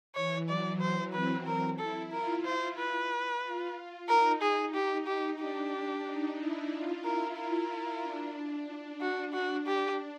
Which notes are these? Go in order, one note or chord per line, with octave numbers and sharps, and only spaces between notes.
E3 C#5
F#3 D5
F#3 C5
C4 B4
A#4
E4 A4
F4 A#4
C5
B4
F4
D#4 A#4
G#4
G4
G4
D4 G4
D#4
E4
F4
E4 A#4
A#4
D4
F#4
F#4
G4